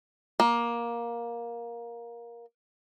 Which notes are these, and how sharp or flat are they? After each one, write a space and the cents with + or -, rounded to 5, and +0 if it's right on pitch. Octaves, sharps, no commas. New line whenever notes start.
A#3 +15